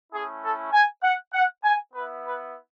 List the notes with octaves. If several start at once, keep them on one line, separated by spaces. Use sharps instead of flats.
A3 C#4 E4 G#4
A4
G#5
F#5
F#5
G#5
B3 E4 B4
B4